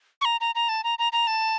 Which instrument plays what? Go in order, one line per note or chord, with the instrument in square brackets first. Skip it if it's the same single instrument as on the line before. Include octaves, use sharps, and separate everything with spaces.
[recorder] C#6
A#5
A#5
A#5
A5
A#5
A#5
A#5
A5